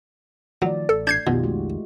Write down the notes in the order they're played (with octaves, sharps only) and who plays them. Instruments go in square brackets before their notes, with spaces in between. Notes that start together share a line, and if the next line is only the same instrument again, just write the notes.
[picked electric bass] D#3 F3 [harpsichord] F#3 [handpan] A3 D5
[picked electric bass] A1 [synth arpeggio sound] A4
[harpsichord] D4 [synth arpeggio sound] G6 G#6 C7
[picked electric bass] B1 F2 D#3 [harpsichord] B2 [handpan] F4 G4
[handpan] G#3 A3 F#4